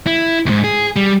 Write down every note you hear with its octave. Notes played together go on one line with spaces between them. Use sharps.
E4
D#2 G#2
G#4
G3